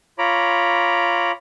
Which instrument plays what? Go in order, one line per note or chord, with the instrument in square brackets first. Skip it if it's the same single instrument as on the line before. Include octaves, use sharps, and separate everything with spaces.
[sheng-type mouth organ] F4 C#5 A#5 B5 D6